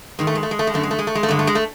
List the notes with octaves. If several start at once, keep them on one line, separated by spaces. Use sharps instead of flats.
G#2 D#3 G#3
A3
G#3
A3
G#3
A3
G#3
F#2 D3 A3
G#3
A3
G#3
A3
G#3
A3
G2 D3 G#3
A3
G#3
A3